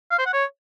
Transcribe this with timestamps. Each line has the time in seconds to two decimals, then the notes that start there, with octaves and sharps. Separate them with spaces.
0.11 F5
0.18 C5
0.26 F#5
0.33 C#5